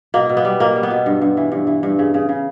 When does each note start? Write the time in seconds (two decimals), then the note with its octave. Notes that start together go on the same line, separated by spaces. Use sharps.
0.14 B2 A#3
0.29 B2
0.37 B3
0.45 G3
0.60 B2 A#3
0.76 G3
0.83 B3
0.90 B2
1.06 G2
1.22 G2
1.37 E3
1.52 G2
1.67 E3
1.83 G2
1.99 C#3
2.14 C#3
2.29 C#3